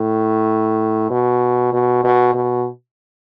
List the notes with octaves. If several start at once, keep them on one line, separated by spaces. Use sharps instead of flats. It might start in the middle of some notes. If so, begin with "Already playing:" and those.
Already playing: A2
B2
B2
B2
B2